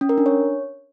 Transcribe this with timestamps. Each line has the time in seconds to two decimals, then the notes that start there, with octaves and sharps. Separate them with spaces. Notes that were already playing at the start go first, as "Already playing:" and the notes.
0.01 C#4
0.09 A#4
0.18 D4
0.26 C#5